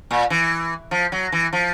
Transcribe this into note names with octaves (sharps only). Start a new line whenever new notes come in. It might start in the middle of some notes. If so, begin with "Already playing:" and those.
A#2
E3
F3
F#3
E3
F3